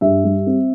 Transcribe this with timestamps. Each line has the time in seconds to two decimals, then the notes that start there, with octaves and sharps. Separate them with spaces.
0.01 G2 E5
0.24 G3
0.46 C4